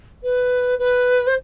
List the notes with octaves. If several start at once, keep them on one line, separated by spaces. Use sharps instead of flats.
B4
B4
C5